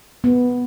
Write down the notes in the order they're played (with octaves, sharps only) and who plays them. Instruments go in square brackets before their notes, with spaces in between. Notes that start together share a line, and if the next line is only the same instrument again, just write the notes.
[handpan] B3